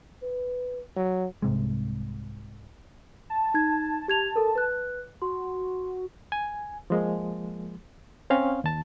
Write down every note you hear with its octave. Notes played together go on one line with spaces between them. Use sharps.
B4
F#3
C2 G#2 C3 G#3
A5
D#4 G#6
G4 G#6 F7
A4 A#4
B4 F#6
F#4 C6
G#5
F3 G#3 A#3
C4 C#4 F5
D#2 A5